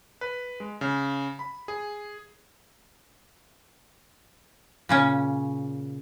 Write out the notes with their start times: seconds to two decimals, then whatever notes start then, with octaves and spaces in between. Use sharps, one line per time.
0.21 B4
0.60 G#3
0.81 C#3
1.39 B5
1.68 G#4
4.89 A#2 C#3 C#4